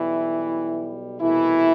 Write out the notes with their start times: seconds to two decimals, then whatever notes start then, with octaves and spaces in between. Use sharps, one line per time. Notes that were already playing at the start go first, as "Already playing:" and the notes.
Already playing: B1 B2 E3 G3 E4
1.20 C2 B2 E3 A3 E4